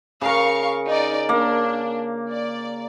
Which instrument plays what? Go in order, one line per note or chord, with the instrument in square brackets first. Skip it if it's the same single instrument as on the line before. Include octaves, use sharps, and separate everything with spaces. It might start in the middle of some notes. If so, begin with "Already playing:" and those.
[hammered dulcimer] C#3 A#4 [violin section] F5 C#6
[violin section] D#4 D5
[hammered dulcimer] A#3 [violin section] D4
[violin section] D5